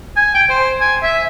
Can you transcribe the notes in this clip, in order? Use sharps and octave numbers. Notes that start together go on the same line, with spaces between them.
G#5
G5
C5
G#5
E5